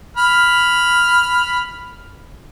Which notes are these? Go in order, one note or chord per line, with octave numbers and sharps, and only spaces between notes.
B5 F6